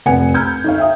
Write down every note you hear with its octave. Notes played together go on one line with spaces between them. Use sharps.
F1 B4 F#5 G#5 C#7
A#5 B5 E6 F6 G6 G#6
D#4 C#5 F5
E5 G5 D#6